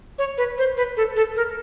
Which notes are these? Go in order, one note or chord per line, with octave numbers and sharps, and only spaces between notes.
C#5
B4
C5
B4
A4
A4
A#4